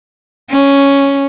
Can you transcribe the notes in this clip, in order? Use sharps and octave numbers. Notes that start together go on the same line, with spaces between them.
C#4